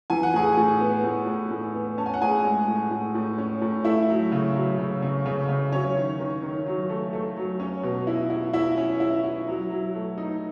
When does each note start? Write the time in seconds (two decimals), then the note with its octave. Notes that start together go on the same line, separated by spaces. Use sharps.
0.10 E3 G#5
0.23 F#5
0.34 A2 G#4 G#5
0.57 A2
0.80 B3
1.04 A2
1.27 A2
1.51 A2
1.74 B3
1.98 C#4 A5
2.06 G#5
2.14 F#5
2.21 A2 G#4 G#5
2.44 G#3
2.68 A2
2.91 A2
3.15 A2
3.38 C#4
3.62 A2
3.85 A3 E4 E5
4.09 F#3
4.32 C#3
4.55 F#3
4.78 C#3
5.02 C#3
5.26 C#3
5.49 C#3
5.72 F#3 C#4 C#5
5.96 D#3
6.19 D#3
6.43 D#3
6.66 F#3
6.89 A3
7.13 A3
7.36 F#3
7.60 C#4
7.83 B2
8.07 E4
8.30 E4
8.53 E4 E5
8.77 C#4
9.00 E4
9.24 E4
9.47 F#3
9.70 F#3
9.95 A3
10.18 D#4